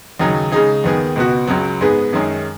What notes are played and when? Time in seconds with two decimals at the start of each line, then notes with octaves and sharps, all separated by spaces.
0.20 D#2 C#3 F#3 D#4 G#4
0.52 C#3 G#3 D#4 G#4
0.84 D#2 D#3 B3 G#4
1.16 C#2 B2 B3 F#4
1.47 C#2 C#3 F#3
1.81 G#2 G#3 B3 G#4
2.13 F#2 D#3 G#3 C#4 G#4